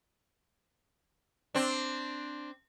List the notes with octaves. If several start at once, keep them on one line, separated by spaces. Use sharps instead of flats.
C4 D4